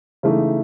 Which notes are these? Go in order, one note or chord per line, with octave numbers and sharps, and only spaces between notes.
C#3 E3 A3 D#4